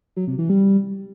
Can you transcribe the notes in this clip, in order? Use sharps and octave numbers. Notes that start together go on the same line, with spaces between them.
F#3
C3
E3
G3